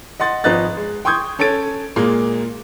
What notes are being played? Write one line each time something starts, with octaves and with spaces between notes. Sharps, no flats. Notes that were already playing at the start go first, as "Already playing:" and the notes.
D#5 F#5 C6 A6
G#1 F3 B4 D#5 F#6 A6
G#3
G5 C6 C#6 D#6 G6 G#6
C#4 A4 C#5 A6 D7
A#2 G#3 A#3